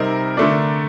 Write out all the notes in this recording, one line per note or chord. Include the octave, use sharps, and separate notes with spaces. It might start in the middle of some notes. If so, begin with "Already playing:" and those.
Already playing: C3 G3 C4 D#4 A#4
D3 A3 D4